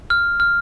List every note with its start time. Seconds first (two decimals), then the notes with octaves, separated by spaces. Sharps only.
0.10 F6
0.40 F6